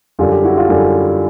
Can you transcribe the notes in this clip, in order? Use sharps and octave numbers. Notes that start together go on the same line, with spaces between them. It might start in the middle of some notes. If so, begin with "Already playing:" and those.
F#2 D3 G3 F4 G4
F4 G4
E4 F#4
F4 G4
F#2 D3 G3